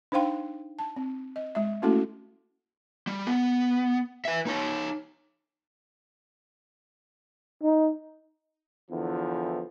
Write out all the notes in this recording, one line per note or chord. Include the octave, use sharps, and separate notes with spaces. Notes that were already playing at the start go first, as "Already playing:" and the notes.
D4 D#4 C5 F5 G5 C6
A5
C4
D#5
G#3 E5
A3 A#3 C#4 E4 F#4 A4
G3
B3
B4 E5
D#4 C#5
D#4
E2 D3 E3 F3